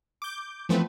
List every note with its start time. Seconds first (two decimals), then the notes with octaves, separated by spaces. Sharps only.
0.22 D6 G6
0.69 E3 F3 A3 B3 C4 B4